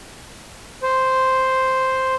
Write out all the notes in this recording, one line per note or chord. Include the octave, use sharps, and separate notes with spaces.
C5